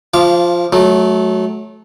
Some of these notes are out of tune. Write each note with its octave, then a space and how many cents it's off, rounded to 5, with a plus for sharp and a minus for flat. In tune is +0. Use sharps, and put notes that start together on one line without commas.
F3 +0 F5 -25 D6 -20
F#3 +0 A3 -25